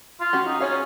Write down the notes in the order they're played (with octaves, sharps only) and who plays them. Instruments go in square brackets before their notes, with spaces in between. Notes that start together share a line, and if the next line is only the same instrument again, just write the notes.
[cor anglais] F4
[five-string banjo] C#4 F#4 G4
[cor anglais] D#4
[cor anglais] C#4 [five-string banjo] G#4 C#5 F5